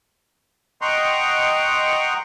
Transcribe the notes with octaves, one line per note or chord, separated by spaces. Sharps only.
D#5 F#5 G5 A#5 C6 C#6